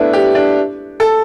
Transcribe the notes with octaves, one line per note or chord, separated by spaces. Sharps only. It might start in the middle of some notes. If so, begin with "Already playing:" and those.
Already playing: A3 B3 D4 E4
G4
D4
A4